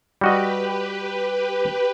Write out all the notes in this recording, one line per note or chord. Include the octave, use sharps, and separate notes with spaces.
G3 F#4 G4 B4 D#5